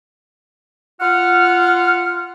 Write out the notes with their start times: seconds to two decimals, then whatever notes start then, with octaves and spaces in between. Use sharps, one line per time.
1.01 F4 F#5 F6